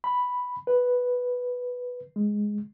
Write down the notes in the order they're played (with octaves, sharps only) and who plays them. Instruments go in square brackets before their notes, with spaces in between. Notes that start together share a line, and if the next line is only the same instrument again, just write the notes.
[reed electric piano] B5
B4
G#3